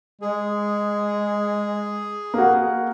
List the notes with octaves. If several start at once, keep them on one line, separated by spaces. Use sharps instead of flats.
G#3 G#4
A#3 F#4